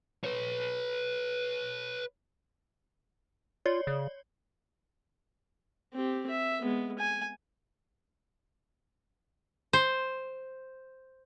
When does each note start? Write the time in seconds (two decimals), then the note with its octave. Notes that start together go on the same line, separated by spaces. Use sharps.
0.24 B4 C#5
3.66 F4 C#5 D5
3.87 C#3
5.94 C4 G4
6.30 E5
6.61 G#3 B3
6.99 G#5
9.73 C5